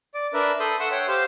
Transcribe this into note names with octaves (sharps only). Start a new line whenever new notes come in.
D5 D6
D4 A#4 B4 E5
A4 B5 C6 D#6 G6
E5 F#5 C6 C#6 E6
C#5 F#5 G5 C6
G4 C5 F5 C6 E6